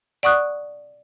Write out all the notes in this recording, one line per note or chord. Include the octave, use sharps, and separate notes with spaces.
D5 F#5 C#6 D#6 F#6